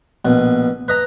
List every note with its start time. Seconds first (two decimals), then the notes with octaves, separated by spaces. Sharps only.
0.25 A#1 B2
0.88 B4 D#5 A#5